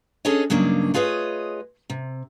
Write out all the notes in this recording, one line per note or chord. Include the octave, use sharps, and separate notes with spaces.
C#4 D4 G#4 A4 C#5 D#5
G2 C#3 F#3 A#3 D4 D#4
A3 F4 G#4 B4 C#5 D#5
C3